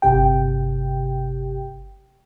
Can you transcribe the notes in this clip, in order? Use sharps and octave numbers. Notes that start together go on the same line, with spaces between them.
G1 C3 G4 G5